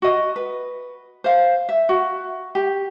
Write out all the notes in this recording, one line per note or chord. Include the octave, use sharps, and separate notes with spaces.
F#4 D#5
B4
C5 F5
E5
F#4
G4